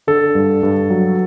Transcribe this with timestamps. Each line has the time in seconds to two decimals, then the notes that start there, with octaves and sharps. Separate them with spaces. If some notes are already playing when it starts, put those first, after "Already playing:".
0.07 D3 A4
0.35 G2
0.63 G2
0.90 F#3